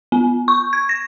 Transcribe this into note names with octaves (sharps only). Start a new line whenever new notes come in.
B3
C#6
G#6
A#6